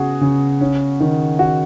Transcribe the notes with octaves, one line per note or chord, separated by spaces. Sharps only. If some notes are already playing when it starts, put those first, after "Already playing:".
Already playing: C#3 B3 F#4 G#4
C#3
C#4
D#3
D#3 F#4